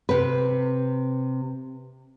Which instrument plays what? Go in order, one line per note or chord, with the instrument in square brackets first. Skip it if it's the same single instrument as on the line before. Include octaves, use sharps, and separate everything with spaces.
[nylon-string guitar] C3 B4